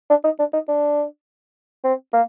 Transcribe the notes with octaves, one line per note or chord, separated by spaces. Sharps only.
D4
D#4
D4
D#4
D4
C4
A#3